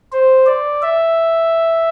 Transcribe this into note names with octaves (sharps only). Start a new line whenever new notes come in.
C5
D5
E5